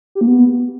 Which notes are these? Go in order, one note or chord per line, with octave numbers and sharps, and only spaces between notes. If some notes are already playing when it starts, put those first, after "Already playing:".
G4
A#3
B3